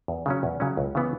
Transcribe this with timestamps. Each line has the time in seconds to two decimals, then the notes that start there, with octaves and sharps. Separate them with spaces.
0.08 E2
0.26 C#3 F#3 C#4
0.43 E2
0.60 C#3 F#3 C#4
0.77 C#2
0.95 C#3 E3 B3